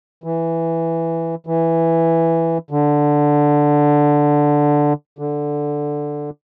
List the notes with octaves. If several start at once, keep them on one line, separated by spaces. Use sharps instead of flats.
E3
E3
D3
D3